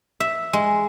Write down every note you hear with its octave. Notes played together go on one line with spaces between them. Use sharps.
E5
G#3